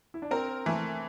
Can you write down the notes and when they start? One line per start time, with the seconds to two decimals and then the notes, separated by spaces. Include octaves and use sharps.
0.14 E4
0.22 D4
0.31 C4 A#4
0.66 E3 A3